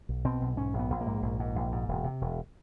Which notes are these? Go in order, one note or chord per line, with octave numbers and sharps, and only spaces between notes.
B1
B2 C4
B1
G#2 C#4
A#1
B3
A#1
A#3
G#2
A#1
G#2
A#1
G#2
E1
C3
E1